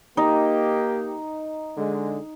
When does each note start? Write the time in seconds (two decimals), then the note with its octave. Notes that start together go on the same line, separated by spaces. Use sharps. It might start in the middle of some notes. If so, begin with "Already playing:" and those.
0.17 A#3 D#4 G4
1.77 D3 G#3